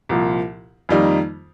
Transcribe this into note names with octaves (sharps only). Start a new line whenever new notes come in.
C2 A#2 F3
F2 D#3 G3 A#3 D#4